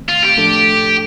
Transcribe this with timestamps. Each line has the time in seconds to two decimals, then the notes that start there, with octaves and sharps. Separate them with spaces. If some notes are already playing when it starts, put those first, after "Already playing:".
Already playing: D#3 A3 C4
0.09 F4
0.23 G4
0.37 A2 F3 A3 D4 A4